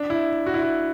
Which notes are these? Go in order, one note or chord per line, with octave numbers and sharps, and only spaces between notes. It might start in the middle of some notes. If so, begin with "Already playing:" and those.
Already playing: D4
E4
F#4
E4
F#4